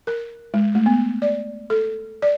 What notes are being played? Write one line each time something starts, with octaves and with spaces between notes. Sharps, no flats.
A#4
G#3
A3
B3
D5
A4
D5